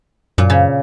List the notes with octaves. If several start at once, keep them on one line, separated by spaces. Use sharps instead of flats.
F#2 A#2
C#3